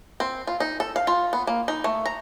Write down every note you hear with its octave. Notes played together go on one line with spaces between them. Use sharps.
C4
F4
D#4
A4
F5
F4
B3
A#3
D#4
A3
A#5